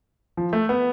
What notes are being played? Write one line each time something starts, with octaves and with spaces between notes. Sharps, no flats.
F3
A3
B3